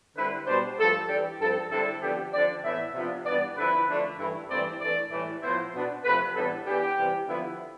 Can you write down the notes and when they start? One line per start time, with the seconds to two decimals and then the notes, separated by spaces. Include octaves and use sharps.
0.17 D3 G3 C4 E4 B4
0.47 B2 G3 D4 C5
0.78 G2 F3 A3 A4
1.09 E3 G3 D4 G4
1.40 G2 F3 C4 A4
1.71 D3 G3 C4 E4 A4
2.02 D3 F3 B3 D4 G4
2.33 D3 F3 C4 D5
2.64 A2 E3 B3 E4 E5
2.95 C3 F3 B3 D4
3.26 G2 E3 B3 D5
3.57 D3 F3 C4 E4 B4
3.88 D3 F3 A3 D4
4.19 G2 E3 A3 E4
4.49 G2 E3 A3 C4 E4 D5
4.80 E3 A3 D4 D5
5.12 A2 E3 G3
5.43 A2 F3 B3 E4 C5
5.74 B2 B3 D4
6.04 C3 F3 A3 B4
6.35 A2 E3 G3 B3 D4 A4
6.67 E3 B3 D4 G4
6.97 C3 E3 G3
7.28 D3 F3 B3 E4